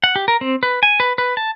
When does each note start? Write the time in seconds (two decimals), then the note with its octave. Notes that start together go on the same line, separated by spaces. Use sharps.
0.04 F#5
0.16 G4
0.28 A#4
0.41 C4
0.63 B4
0.83 G#5
1.00 B4
1.18 B4
1.37 A5